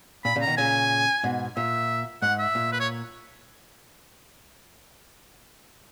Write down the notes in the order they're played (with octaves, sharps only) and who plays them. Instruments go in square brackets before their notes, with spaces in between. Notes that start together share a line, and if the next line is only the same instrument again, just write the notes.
[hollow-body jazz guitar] A#2 [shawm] B5
[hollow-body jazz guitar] A#2 C#3
[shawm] A#5
[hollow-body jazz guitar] B2 D#3
[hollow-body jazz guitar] A#2 C#3 [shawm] G#5
[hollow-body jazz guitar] G#2 B2
[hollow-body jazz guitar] A#2 [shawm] E5
[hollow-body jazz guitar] G#2 [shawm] F#5
[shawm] E5
[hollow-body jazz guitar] A#2
[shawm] B4
C#5